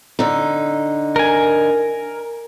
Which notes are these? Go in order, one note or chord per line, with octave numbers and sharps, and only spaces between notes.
D3 D#4
A#4 G#5